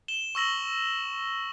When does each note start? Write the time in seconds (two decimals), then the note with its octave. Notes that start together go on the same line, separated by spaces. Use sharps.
0.08 E7 G7
0.35 C#6 E6 A#6 F#7